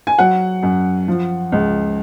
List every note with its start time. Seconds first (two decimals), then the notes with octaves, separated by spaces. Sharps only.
0.07 G#5
0.18 F#3 F#5
0.63 F#2
1.08 F3
1.52 C#2